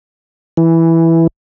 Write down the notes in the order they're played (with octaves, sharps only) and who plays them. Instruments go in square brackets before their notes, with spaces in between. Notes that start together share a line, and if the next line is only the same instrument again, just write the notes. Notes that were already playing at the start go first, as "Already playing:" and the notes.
[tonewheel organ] E3